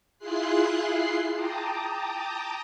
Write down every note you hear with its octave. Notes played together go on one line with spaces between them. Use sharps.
E4 F4 G#4 C6 F#6 C7
G5 A5 A#5 D6 D#6